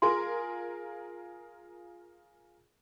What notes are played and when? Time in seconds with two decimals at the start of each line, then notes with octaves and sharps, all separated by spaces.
0.02 F4 G#4 A#4 C6